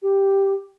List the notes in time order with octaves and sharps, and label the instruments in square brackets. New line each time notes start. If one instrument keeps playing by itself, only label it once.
[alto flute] G4